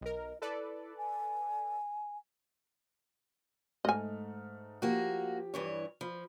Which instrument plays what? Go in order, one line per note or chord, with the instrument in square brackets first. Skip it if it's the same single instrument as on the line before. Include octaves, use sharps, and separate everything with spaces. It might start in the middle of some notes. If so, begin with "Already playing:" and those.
[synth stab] B1 A#4 [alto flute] D#5
[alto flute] E4 [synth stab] A4 B4 D5
[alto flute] G#5
[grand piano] G#2 A3 F6 [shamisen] D#5 G#5
[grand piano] F3 G4 [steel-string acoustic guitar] A#3 F#4
[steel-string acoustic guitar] G2 E3 C#5
[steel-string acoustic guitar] F3 [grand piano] B5